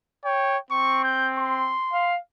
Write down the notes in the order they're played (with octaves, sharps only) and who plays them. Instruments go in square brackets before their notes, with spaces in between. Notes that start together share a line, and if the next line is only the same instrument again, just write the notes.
[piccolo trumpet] C#5 [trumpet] G5
[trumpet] C4 [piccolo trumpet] C#6
[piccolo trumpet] G6
C6
[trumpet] F5